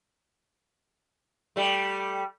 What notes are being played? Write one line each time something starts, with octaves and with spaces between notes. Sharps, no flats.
G3 A3